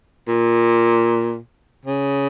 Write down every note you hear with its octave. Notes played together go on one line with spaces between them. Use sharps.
A#2
C#3